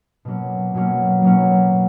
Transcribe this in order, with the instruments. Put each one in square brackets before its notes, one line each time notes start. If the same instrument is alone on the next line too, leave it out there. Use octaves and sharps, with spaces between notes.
[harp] B2 F#3 A#3 C#4
B2 F#3 A#3 C#4
B2 F#3 A#3 C#4
B2